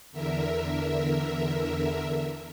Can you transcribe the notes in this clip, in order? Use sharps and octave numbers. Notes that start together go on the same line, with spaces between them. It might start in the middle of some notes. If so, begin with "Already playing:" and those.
E2 D3 A#4 E5